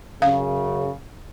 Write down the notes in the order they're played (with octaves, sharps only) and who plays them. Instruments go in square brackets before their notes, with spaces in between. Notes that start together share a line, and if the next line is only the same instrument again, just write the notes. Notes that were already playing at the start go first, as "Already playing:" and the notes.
[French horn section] F#2 C#3 [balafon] F5